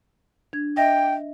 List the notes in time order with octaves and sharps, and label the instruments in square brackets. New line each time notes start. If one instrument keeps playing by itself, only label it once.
[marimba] D4 G#6
[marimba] D#5 E5 A#6 [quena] G5